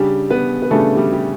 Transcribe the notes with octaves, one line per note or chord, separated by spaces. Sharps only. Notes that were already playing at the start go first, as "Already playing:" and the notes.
Already playing: C#3 G3 D4 G4
B3 B4
B4
C#3 G3 A3 D4 A4
G3 G4
G4